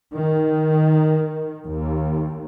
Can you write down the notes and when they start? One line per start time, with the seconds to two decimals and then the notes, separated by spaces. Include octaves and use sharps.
0.16 D#3
1.65 D#2